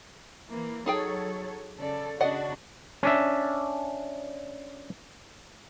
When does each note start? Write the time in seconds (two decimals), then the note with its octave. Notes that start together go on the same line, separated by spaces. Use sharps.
0.50 E3 A#3
0.86 F#3 D#4 G#4 A4 C#5 G5
1.77 C#3 A4 D5
2.21 C#3 D4 F#4 D5 D#5 F#5
3.03 C#4 D4 E5